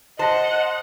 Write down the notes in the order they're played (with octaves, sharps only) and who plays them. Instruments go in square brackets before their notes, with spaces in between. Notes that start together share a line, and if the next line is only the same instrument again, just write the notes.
[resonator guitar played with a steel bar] C5 [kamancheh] D#5 [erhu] F#5 [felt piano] A5 A#6